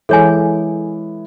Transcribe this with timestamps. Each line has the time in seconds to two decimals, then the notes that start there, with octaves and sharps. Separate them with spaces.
0.09 E3 G#3 A4 C#5 G#5